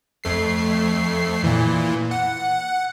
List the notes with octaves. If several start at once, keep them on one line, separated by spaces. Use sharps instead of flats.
F2 A3 C7
A#2 E3
F#5